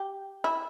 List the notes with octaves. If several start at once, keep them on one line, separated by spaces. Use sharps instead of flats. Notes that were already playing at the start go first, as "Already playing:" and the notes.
Already playing: G4
E4